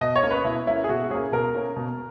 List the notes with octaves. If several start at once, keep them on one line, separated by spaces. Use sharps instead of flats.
B2 D#5
C#5
A#3 C#4
B4
B2 E4
A#3 C#4 E4
G#4
B2 F#4
A#3 C#4 G#4
B2 A#4
A#3 C#4
B2